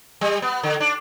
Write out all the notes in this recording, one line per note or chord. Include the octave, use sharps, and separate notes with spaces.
G3
B3
D3
D4